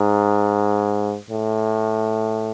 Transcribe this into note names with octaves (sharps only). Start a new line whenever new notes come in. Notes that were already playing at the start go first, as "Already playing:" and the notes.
Already playing: G#2
A2